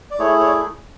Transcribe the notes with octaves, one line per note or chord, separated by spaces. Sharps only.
D5
A3 E4 G#4 C#5
C#5
D5